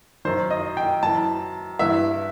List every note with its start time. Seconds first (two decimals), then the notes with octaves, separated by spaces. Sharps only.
0.25 F#2 D#3 C5
0.51 D#5
0.77 G5
1.03 F#2 E3 A5
1.79 G2 E3 E5